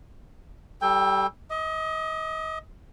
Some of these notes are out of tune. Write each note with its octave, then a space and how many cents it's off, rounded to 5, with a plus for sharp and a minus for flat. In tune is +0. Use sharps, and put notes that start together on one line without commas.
G3 -15 A4 +0 G5 +25
D#5 +35 D#6 -35